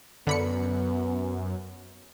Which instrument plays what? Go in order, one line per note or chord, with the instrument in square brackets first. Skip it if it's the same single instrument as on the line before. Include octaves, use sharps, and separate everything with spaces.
[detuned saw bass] F#2 [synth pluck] D3 B5 C#7 [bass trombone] B3